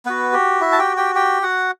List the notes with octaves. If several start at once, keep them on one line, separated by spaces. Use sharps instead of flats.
B3 F#4 B4
G4
E4 E5
A5
G4 G5
G4 G5
G4 G5
F#4 F#5